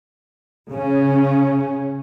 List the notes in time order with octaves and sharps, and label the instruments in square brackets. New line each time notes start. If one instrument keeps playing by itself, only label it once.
[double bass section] C#3 C#4